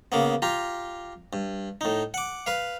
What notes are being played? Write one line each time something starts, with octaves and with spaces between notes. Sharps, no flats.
C#3 A#3 B3
F4 G4 A#5
G2
A2 D#4
F#5 D6
B4 F5